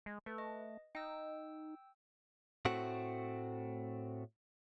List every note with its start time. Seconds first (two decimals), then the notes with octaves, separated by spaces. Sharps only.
0.06 G#3
0.26 A3 B4
0.38 D#5
0.95 D#4 G5 E6
2.65 A2 A3 C4 F#4